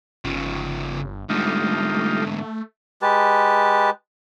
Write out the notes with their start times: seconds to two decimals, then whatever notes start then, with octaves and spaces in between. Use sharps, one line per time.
0.24 G1 C#3 F3
1.29 G#2 D3 G3 A3 D#4 F4
3.02 G#3 G4 B4 A5